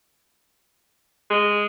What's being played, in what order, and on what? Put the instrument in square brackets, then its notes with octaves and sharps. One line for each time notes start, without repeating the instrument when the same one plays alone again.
[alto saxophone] G#3